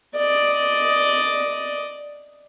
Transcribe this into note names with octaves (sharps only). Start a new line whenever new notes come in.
D5 D#5